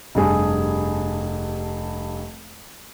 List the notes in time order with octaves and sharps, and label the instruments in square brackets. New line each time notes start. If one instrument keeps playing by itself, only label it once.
[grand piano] F1 G2 G#4 G#5